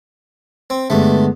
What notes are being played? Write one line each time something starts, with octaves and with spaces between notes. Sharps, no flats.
C4
G2 D3 G#3 A3 B3